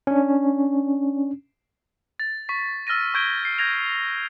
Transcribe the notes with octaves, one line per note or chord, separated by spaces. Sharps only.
C#4 D4
A6
C#6 B6
E6 F6 A6 A#6 D#7
C#6 G6 G#6 D7 G7
C7
G6 G#6 A#6 F7